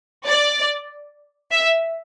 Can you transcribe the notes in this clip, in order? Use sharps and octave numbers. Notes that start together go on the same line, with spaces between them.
D5
E5